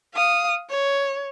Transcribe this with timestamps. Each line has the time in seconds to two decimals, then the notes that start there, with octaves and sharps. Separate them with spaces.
0.14 F5 D#6
0.70 C#5